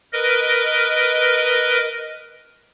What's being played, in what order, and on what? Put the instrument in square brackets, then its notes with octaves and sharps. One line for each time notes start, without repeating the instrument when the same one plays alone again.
[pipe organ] A#4 B4 D#5